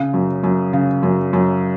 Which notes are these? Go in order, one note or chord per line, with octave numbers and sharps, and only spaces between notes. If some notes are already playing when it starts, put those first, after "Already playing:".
Already playing: C#3
F#2
F#2
C#3
F#2
F#2